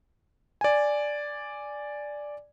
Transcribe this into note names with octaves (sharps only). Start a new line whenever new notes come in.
D5 G#5